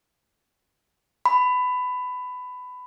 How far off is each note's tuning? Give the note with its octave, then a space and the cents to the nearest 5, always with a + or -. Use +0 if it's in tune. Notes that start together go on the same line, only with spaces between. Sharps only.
B5 +20